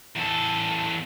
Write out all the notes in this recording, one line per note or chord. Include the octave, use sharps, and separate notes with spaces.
E2 A4